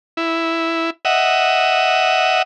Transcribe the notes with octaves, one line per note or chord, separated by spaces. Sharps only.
E4
D#5 E5 F#5